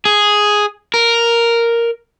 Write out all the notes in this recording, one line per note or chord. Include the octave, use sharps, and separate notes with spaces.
G#4
A#4